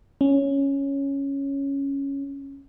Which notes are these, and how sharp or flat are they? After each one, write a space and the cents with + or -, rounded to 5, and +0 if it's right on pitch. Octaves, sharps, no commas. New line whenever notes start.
C#4 +0